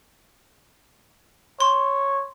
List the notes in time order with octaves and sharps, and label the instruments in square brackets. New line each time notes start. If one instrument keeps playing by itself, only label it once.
[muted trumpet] C#5 [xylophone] C6